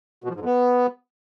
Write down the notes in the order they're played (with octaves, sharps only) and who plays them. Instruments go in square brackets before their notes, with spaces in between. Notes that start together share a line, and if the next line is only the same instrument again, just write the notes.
[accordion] B2
F3
G#2
F2
B3